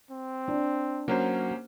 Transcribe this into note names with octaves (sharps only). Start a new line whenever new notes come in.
C4
D4
F#3 A#3 C#4 C5